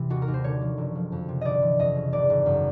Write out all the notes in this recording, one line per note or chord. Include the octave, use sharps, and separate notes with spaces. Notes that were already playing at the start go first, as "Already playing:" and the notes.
Already playing: C3 E3
D#2 F#4
A#4
D#2
C5
D3 C#5
F3
F#1
F3
F2
C3
G1 D5 D#5
E3
F2 D#5
C#3
G#1 D5
G#1
F#2